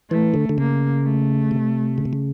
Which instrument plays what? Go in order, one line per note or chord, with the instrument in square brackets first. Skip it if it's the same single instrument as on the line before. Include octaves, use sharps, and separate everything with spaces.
[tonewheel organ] E3 [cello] A3
[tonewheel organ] D3
D3
[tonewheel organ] C#3 [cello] A#3
[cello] A3
[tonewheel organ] C3
C#3
C3
C#3